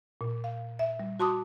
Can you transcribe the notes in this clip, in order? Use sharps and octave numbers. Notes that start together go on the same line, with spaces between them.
A#2
F5
E5
G3
F#4 A5 C6 D6 D#6